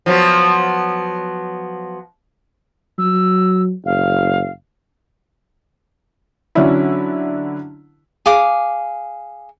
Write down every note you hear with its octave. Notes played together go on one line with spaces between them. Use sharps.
F3 F#3 B3
F#3 E6
F#1 F5
D3 F#3 C#4 D4 E4
G#4 F5 D6 D#6